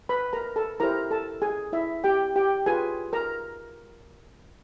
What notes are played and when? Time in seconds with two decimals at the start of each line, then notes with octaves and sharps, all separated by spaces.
0.09 B4 B5
0.33 A#4 A#5
0.56 A4 A5
0.80 E4 G4 A#4 C5 A#5
1.11 A4 A5
1.42 G#4 G#5
1.73 E4 E5
2.04 G4 G5
2.36 G4 G5
2.66 F4 G#4 B4 G#5
3.13 A#4 A#5